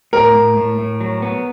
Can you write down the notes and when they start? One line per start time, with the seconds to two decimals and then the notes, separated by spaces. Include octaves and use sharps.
0.13 A2 A#4
0.35 A2
0.57 A2
0.78 A2
1.01 F#3
1.22 B3